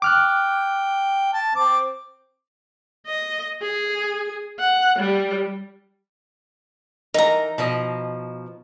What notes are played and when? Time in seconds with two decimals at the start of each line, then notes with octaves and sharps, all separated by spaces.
0.02 G5 D6 F6 F#6
1.33 A5
1.55 C4 D6
3.06 D#5
3.62 G#4
4.59 F#5
4.99 G3
7.14 E3 D#4 A#4 A#5
7.58 B2 F3 D#5